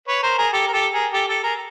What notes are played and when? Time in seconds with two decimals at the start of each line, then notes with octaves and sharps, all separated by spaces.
0.08 B4 C#5
0.23 A#4 C5
0.38 G#4 A#4
0.53 G4 A4
0.67 A#4
0.73 G4 A4
0.93 G#4 A#4
1.13 G4 A4
1.28 G4 A4
1.44 G#4 A#4